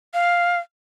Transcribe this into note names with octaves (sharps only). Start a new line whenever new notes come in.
F5